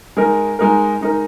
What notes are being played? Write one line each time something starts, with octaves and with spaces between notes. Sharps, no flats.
G#3 D#4 A#4
G#3 D#4 A#4
G#3 D#4 A#4